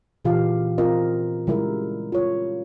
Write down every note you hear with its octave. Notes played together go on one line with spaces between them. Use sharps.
A#2 C#3 E3 F4 G4 F5
C4 F4 A#4 D#5
C#3 G3 G#3 E4 A#4
F4 C#5